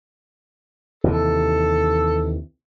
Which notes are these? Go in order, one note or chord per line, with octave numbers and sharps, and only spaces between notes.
D#2 C3 E3 A4